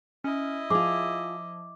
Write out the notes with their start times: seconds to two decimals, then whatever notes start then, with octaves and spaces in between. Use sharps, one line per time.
0.24 C#4 E4 D#5
0.70 F3 F4 G#4 D6